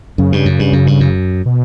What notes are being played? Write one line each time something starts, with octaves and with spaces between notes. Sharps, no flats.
F#2 C#3
G2
F#2
G2
F#2
G2
F#2
B2